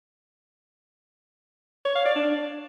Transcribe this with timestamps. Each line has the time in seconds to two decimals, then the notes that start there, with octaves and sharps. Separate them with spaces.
1.85 C#5
1.95 F5
2.05 D5
2.16 D4